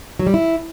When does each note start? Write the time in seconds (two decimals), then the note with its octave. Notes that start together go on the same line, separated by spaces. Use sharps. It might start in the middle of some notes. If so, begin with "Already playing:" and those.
0.19 F#3
0.27 G3
0.34 E4